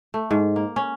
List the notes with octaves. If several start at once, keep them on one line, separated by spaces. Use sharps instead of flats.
A3
G#2
A#3
C#4